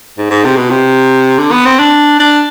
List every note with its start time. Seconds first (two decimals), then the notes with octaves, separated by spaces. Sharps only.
0.18 G#2
0.30 G#2
0.44 C3
0.56 B2
0.70 C3
1.38 D3
1.52 B3
1.65 C4
1.79 D4
2.19 D4